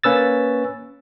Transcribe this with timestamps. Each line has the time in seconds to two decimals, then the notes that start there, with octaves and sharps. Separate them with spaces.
0.04 A#3 C#4 B4 E6 A6